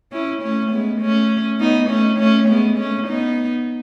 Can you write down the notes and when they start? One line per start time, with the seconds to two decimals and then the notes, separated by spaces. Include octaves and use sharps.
0.12 C#4 E4
0.42 A3 C#4
0.71 G#3 B3
1.01 A3 C#4
1.60 B3 D#4
1.89 A3 C#4
2.19 A3 C#4
2.48 G#3 B3
2.78 A3 C#4
3.07 B3 D#4